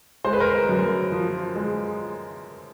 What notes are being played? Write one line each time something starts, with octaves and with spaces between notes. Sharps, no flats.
G#3 C5
B4
A#4 C5
F#2
F3
G#3